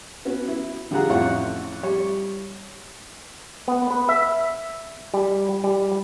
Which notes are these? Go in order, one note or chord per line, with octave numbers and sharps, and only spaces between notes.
B3 C#4 F#4
E4
D3 G3 F4 G#4 F#5 A#5
A1 F2 A2 F4 C#5 F#5
G3 C#5
B3
B4
E5
G3
G3